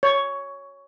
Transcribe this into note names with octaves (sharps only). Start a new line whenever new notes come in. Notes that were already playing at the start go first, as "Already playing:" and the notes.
C#5